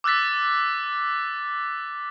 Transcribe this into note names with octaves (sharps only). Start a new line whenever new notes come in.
D6 E6 F#6 A6 B6